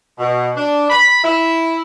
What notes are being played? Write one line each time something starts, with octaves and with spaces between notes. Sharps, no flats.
B2
D4
B5
E4